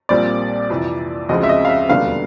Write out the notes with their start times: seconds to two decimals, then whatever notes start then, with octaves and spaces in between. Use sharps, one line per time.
0.09 A#1 A#2 G3 C4 D5
0.70 F2 C3 E3
1.29 D2 C#3 F3 G#3 C4 D#5
1.43 E5
1.49 D#5
1.65 F5
1.69 E5
1.89 E1 D#2 D3 G3 B3 F5